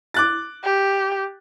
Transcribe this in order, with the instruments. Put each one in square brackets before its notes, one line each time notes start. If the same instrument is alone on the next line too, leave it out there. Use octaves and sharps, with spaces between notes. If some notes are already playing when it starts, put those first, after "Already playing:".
[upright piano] D6 F#6 A6
[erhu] G4